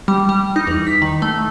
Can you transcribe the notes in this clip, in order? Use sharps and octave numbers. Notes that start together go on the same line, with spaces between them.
G3
G3
D#4
E2
B6
D#3
A3